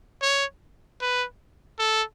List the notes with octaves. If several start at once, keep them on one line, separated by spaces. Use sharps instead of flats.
C#5
B4
A4